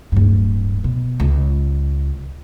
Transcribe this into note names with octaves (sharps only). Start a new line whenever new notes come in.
D1 G2
B2
C#2